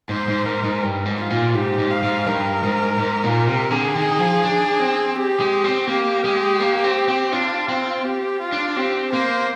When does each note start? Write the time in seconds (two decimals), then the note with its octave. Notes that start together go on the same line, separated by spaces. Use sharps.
0.09 G#2 C5
0.28 G#2
0.46 G#2 A#4
0.64 G#2
0.82 G2
1.06 G#2
1.18 F4
1.30 A#2
1.54 G#2 G4
1.78 G#2
1.90 F5
2.03 G#2
2.26 G2 A#4
2.63 G#2
2.99 G#2
3.24 A#2
3.47 C3
3.71 D3 G#4
3.96 D#3
4.19 F3
4.44 D4
4.79 C4
5.16 G4
5.40 G#3
5.64 C4
5.88 A#3 G4
6.25 G#3
6.60 A#3
6.84 C4
7.08 C4
7.32 D4 F4
7.69 C4
8.04 G4
8.41 F4
8.52 D4
8.76 C4 G4
9.13 A#3 C5